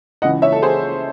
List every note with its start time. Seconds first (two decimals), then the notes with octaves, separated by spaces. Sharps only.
0.22 C#2 C#3 E3 D#5 F#5
0.42 C#5 E5
0.52 A4
0.62 G#4 C5